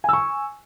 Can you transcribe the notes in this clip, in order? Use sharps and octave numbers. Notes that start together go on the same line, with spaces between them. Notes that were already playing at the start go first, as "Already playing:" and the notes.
G#5 C#6 E6